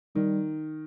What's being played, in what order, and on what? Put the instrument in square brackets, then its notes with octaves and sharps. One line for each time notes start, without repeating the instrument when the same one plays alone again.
[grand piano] D#3 [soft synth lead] G3